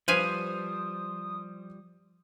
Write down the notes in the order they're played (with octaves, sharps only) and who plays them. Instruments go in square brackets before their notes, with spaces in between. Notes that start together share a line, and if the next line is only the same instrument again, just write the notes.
[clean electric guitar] F3 G3 [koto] B4 F5 G#5 [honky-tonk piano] C5 D#7 [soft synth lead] D#6